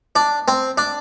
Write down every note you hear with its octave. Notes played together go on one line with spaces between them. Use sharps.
D4
C4
D4